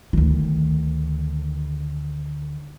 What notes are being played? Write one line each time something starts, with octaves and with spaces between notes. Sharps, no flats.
D2 D#3